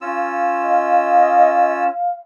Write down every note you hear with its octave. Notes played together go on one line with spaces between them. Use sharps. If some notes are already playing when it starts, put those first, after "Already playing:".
C#4 F4 F5 E6
D#5